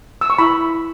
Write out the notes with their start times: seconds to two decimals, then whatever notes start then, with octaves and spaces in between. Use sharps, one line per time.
0.21 E6
0.30 C#6
0.38 E4 B5